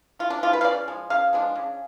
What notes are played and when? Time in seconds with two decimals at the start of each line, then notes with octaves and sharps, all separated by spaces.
0.19 C#3 F4
0.30 D4
0.43 F3 G#3 F4
0.53 B4
0.61 F5
0.65 C#3 D5
0.88 F3 G#3
1.10 C#3 F5
1.33 F3 G#3 D4
1.56 C#3